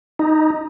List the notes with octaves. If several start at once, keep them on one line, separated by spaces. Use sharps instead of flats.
D#4